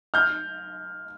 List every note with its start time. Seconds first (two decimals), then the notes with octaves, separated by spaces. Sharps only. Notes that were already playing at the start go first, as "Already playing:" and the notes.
0.14 F6 G6